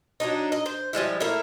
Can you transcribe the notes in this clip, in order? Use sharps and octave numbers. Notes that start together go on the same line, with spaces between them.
F#3 D4 D#4
D#5
C5
F3 G3 G#3 E4
A3 A#3 E4 A#4